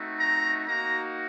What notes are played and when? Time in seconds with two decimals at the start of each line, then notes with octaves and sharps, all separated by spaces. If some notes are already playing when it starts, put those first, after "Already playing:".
Already playing: A3 C4 D#4 F#4
0.18 A#5
0.67 A#3 D#4 F#4 A#5